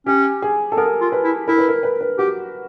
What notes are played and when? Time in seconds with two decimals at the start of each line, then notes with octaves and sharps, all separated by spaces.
0.06 C#4 G4
0.42 G#4
0.72 A4
0.77 B3 A#4
1.01 F4
1.12 B4
1.24 E4
1.48 E4 A#4
1.58 B4
1.69 A#4
1.83 B4
2.01 B4
2.18 F#4 G4